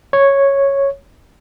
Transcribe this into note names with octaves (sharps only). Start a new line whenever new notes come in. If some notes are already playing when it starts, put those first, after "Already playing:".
C#5